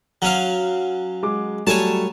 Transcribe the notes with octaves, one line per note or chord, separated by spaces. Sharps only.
F#3 C#4 F5
G#3 D6
F#3 G3 A3 C#5 G#5 A5